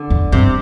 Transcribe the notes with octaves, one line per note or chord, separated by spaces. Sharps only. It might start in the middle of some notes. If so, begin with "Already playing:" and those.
Already playing: D3
E2
G2 C3